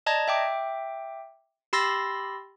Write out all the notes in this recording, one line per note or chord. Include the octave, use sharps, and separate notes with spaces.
D5 D#5 A5 A#5 G#6 A#6
E5 G5 D6
G4 B5 C6 E6 A6 A#6